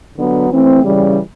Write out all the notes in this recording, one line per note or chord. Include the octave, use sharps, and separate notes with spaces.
D3 F#3 B3
E3 A3 C4
C#3 E3 G3